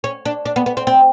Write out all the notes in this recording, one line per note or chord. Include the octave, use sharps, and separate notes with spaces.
C#4
D4
D4
B3
B3
C4
C4